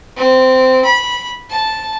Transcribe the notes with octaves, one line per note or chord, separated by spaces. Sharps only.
C4
B5
A5